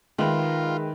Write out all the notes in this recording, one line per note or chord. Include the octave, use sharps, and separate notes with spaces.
D#3 G#3 F4 B4 E5 G5 C6